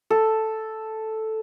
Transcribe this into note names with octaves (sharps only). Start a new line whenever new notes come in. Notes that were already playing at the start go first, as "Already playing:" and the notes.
A4